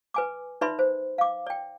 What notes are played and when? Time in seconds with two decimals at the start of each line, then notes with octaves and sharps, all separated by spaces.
0.14 B4 G#5 D6
0.61 D#4 B4 D5 E5 B5 C6
0.79 C5
1.18 F5 D6
1.47 D5 G5